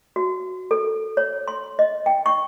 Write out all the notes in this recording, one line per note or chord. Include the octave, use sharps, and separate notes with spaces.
F#4
A4
C#5
C6
D#5
G5
C#6